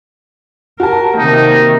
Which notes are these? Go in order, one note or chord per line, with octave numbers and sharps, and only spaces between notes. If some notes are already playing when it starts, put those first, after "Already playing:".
F#4 G4 A#4 A5
C3 D#3 A#3 D#4